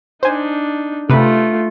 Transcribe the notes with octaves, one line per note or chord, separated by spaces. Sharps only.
D4 D#4 C5 G#5
C3 A3 F4 B4